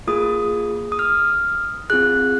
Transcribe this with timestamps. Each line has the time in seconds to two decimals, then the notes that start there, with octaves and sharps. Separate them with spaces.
0.07 A#3 F4 G#4 D#6
0.92 D#6
0.99 F6
1.90 C4 F4 G#4 F#6